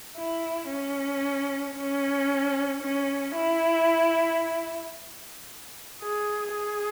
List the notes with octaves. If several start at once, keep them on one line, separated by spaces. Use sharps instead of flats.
E4
C#4
C#4
C#4
E4
G#4
G#4